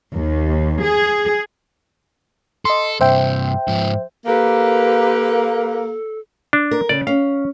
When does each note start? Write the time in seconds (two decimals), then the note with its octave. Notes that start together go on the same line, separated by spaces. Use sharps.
0.14 D#2
0.83 G#4
2.65 A4 D#5 C6
3.01 G2 C3 C5 E5 G5
3.68 G#2 F3
4.26 A#3 G4 A4 B4
6.53 D4
6.71 A#4
6.89 C#3 D5
7.07 C#4 F5